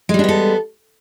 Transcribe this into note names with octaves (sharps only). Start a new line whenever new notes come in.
G3 G#3 B3 D4 A4